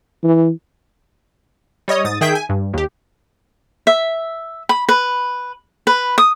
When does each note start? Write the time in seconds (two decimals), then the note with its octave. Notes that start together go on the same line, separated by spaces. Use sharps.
0.23 E3
1.88 G3 C#5 D#5 D#6
2.04 G#2 D#6 A6
2.21 D#3 G#4 E5 G5 G6 B6
2.35 G#5
2.49 G2
2.73 D#2 G4
3.87 E5
4.69 B5
4.89 B4
5.87 B4
6.18 D#6